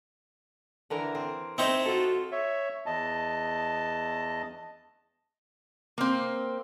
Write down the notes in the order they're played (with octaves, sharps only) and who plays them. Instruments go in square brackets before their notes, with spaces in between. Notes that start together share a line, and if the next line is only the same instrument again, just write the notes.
[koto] D3 E3 A#4
C4
[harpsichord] C4 D#4 C5 [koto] E4 C#5 D#5 [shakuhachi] E5
[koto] F4 A4 [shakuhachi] F#4
[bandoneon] C#5 E5
E2 D#5 A5
[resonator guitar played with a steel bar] A#3 C4